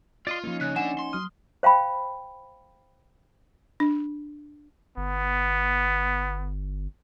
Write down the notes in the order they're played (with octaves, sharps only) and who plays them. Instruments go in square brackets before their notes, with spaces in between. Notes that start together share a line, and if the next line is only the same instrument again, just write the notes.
[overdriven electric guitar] F4 [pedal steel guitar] D5 D#5 C6
[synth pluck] F3 A#3 [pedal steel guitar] C#4 D#4
[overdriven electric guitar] C#3 [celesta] F#6
[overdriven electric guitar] D3 D4 [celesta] F#5 G#5 E7
[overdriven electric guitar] C6
[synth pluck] F#3 D#6 [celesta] F6
[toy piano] C5 F5 G5 B5
[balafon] D4
[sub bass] G1 [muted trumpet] B3